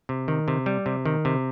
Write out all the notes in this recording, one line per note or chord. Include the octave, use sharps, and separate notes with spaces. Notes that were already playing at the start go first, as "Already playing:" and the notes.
C3
D#3
C3
G3
C3
D#3
C3